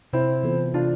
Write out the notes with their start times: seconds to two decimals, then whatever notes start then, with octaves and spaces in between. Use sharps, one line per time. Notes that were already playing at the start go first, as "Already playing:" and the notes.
0.13 C3 C4 E4
0.43 E3 B3 F4 A4
0.74 C3 D4 F4